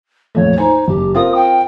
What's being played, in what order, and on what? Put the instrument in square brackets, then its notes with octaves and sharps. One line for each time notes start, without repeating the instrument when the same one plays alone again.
[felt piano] A#1 F2 A3 [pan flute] C#5
[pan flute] D#4 [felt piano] C5 G#5
[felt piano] F#1 [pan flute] G4
[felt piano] C4 F4 A#4 [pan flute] D#6
[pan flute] G5